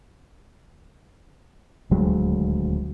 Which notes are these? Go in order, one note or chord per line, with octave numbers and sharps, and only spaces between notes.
D#1 D2 F#3 G#3